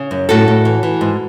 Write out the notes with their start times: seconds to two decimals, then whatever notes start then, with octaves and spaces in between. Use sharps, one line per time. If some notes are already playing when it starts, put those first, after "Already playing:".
Already playing: C#3
0.11 F#2
0.29 A2 F#4 A4
0.48 A2
0.65 E3
0.83 E3
1.01 G#2